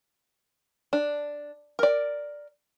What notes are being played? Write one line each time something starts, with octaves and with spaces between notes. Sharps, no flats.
D4
A#4 D5